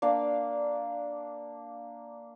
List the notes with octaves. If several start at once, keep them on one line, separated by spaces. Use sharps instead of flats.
A#3 D4 D5 F5